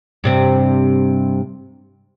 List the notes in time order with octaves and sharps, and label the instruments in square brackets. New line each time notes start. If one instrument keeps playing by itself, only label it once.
[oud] G2 C3 C4